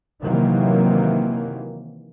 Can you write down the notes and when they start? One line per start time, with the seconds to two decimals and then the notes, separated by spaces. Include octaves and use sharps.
0.24 C3 D#3 E3 F#3 A#3